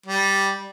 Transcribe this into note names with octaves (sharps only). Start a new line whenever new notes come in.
G3